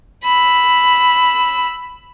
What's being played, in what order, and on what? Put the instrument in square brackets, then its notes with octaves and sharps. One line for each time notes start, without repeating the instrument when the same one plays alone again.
[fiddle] B5 E6